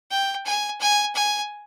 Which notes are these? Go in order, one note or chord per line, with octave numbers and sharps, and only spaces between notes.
G5
G#5
G#5
G#5